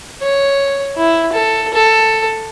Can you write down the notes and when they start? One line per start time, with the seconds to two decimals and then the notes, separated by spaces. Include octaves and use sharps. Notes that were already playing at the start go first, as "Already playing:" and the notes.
0.22 C#5
0.97 E4
1.33 A4
1.74 A4